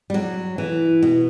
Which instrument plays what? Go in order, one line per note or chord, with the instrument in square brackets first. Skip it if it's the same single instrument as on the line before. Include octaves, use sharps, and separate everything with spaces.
[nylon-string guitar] G3
F#3
E3
B2